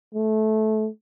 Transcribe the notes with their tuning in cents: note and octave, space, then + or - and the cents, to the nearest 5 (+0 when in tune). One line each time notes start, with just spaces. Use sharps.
A3 -20